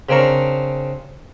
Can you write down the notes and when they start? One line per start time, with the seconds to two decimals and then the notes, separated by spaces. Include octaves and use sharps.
0.09 C#3 C4 D4 A#4 C#6